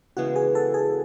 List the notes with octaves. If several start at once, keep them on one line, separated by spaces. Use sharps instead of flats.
C#3 E3 G#3 B3 F#4
G#4
A4
G#4